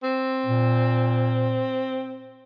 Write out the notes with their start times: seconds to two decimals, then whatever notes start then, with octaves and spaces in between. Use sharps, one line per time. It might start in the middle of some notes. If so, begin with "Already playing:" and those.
0.03 C4
0.46 A#2